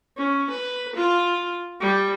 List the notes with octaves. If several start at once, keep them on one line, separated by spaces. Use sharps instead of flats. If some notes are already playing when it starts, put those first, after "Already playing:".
C#4
B4
F4
G3